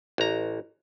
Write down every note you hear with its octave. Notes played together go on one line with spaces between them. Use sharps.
A1 A#5